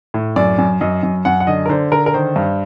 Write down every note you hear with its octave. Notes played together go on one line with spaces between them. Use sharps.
A2
F#2 D5
F#2
F#2 D#5
F#2
F#2 F#5
F#5
D3 D#5
A#4
D3 C5
D3 A#4
A#4
D#3 C5
G2